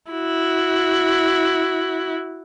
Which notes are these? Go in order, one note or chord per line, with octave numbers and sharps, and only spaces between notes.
E4 F#4